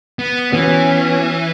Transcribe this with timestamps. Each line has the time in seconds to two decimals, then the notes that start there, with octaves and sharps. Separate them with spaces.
0.19 B3
0.53 E3 B3 C#4 F#4